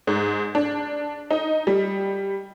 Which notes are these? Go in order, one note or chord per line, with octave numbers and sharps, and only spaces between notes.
G#2
D4
D#4
G3